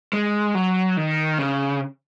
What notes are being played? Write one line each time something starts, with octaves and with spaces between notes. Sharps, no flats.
G#3
F#3
D#3
C#3